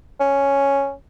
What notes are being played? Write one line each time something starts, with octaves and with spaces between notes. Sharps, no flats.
C#4